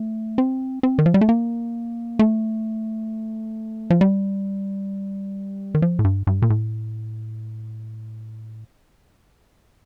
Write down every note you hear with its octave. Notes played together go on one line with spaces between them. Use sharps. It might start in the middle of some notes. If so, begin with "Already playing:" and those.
Already playing: A3
C4
C4
D#3
F3
G3
A3
A#3
A3
F3
G3
D#3
F3
A2
G2
G2
A#2
A2